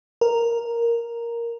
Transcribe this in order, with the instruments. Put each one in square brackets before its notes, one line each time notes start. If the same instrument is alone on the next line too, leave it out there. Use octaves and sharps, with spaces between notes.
[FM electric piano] A#4